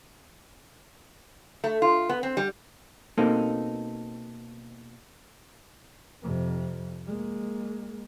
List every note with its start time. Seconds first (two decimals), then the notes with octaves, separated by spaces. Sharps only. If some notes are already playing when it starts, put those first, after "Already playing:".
1.64 A3
1.82 F4
2.09 B3
2.23 C4
2.37 G3
3.18 B2 A#3 C4 D#4 A4
6.22 F2 C3
7.07 G#3 A#3